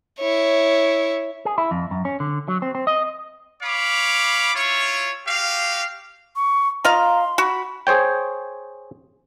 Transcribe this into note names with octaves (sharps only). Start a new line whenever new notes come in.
E4 C#5
G#4
E4
F2
F#2
C#4
D3
F#3
C4
C4
D#5
C#5 F5 B5 D6
E4 F4 C#5
F#4 G4 F5
C#6
F4 D#5 F5 A#5 C6
F#4 B5
G#4 C5 C#5 G5